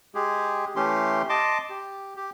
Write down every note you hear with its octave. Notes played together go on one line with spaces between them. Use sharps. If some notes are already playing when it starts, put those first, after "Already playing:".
G#3 G4 G#4
E3 A3 C#4 G4 C6
D#5 A5 C6 D6
G4
G4